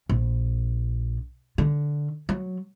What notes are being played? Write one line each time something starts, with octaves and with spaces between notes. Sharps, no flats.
A#1
D3
F#3